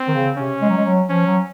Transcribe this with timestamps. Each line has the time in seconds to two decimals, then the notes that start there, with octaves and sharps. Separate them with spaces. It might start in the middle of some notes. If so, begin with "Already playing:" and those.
Already playing: C4
0.08 D#3
0.14 C#3
0.37 C3 C#4
0.61 G#3
0.69 F#3
0.77 G#3
0.85 F#3
1.09 F3 C#4
1.27 F#3